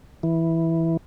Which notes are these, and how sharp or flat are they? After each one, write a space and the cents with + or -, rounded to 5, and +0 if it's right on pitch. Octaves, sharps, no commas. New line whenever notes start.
E3 -5